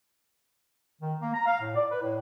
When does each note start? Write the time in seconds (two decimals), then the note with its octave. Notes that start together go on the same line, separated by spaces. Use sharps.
1.00 D#3
1.20 A#3
1.34 A#5
1.46 F5
1.60 A2
1.75 D5
1.90 B4
2.01 A2